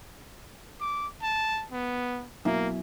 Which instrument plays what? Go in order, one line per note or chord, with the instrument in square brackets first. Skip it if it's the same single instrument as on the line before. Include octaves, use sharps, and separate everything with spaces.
[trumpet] D6
A5
B3
[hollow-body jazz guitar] F#2 B2 E4 [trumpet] A#3